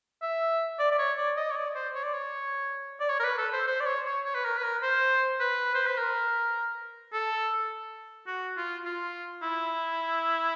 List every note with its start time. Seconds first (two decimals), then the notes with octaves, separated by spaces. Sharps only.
0.22 E5
0.79 D5
0.92 D5
0.98 C#5
1.18 D5
1.37 D#5
1.51 C#5
1.56 D5
1.75 C5
1.95 C#5
2.03 D5
2.14 C#5
3.00 D5
3.09 C#5
3.19 A#4
3.24 B4
3.38 A4
3.53 C5
3.67 C5
3.80 D5
3.86 C#5
4.06 C#5
4.25 C#5
4.34 B4
4.44 A#4
4.57 B4
4.63 A#4
4.83 C5
5.40 B4
5.74 C5
5.87 B4
5.97 A#4
7.13 A4
8.27 F#4
8.57 F4
8.85 F4
9.42 E4